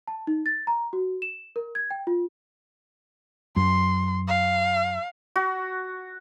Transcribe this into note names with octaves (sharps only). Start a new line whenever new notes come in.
A5
D#4
A6
A#5
F#4
E7
A#4
G#6
G5
F4
F#2 C6
F5
F#4